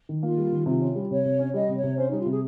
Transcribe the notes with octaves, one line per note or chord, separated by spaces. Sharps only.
D#3
A#3 F4
G3
D#3
C3 F4
C#4
G3
C3 C#5
C3
C#4
G3 D#5
C3
C#5
C3
C#4 C5
G3 D#4
F4
C3 G#4